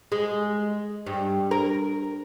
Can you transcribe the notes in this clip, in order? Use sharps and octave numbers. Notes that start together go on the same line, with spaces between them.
G#3
G2
A#4